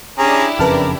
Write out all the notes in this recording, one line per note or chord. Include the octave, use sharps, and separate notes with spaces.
C#4 D4 E4 G4 G#4 A#5
F#1 F2 C#3 A#4 B4 A5 F6